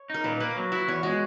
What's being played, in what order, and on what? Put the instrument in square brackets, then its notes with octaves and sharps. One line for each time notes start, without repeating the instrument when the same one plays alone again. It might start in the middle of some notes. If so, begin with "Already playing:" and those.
Already playing: [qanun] C#5
[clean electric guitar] D#4 [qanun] A#4
[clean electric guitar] A#2 [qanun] B4
[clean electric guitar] A#3 [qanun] B4
[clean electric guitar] F#3
[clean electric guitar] E4 [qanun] F#4
[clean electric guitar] E2 [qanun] C#5
[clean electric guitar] G#3 [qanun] F#4